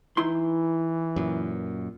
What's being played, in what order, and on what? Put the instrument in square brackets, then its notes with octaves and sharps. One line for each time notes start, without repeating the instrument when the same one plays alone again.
[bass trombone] E3 [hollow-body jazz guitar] D#4 E4 C6
[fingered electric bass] F#2 A#2